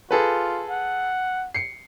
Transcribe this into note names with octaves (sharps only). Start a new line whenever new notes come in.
F4 G#4 A4 B4
F#5
C7 C#7